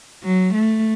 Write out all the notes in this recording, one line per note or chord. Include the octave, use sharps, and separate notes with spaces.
F#3
A3